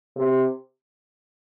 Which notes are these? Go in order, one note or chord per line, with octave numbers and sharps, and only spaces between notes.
C3